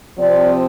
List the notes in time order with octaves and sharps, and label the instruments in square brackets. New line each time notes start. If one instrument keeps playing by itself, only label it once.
[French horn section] C3 F3 C4 D5